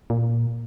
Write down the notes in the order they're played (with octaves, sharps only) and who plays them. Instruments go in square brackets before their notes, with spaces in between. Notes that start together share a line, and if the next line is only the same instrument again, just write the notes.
[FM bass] A#2